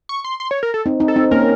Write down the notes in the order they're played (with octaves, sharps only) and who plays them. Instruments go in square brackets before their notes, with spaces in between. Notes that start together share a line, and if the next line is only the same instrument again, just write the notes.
[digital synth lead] C#6
C6
C6
C#5
A#4
A4
[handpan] C4 D#4
C4 D#4
[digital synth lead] A4
[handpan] C4 D#4
[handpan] A#3 C#4 [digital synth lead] A#4